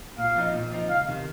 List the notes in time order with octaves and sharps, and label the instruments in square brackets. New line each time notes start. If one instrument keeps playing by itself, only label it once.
[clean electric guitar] A#2 [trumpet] F5
[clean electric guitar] F3 C4 D#4
A#2
F3 C4 D#4
[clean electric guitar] C#2 [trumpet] F5
[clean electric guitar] C3 D#3